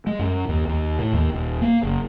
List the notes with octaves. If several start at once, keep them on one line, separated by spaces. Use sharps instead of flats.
G#3
F#2
D#2
D#2
A2
D#2
D#1
A#3
F#1